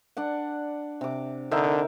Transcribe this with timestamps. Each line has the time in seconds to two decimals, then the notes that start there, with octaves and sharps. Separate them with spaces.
0.17 D4 D5 F#5
1.01 C3 D6
1.51 D3 D#4 A#4 E5